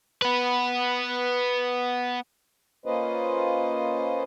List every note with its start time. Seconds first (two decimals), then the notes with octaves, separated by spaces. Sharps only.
0.22 B3 B4
2.86 A#3 C#4 F4 B4 C5 D#5